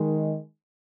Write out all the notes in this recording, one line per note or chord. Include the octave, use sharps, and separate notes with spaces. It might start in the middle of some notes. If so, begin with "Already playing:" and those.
Already playing: D#3 G#3